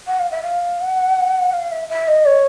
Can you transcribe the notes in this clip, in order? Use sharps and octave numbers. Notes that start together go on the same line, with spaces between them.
F#5
F5
E5
F5
F#5
F5
E5
E5
D#5
C#5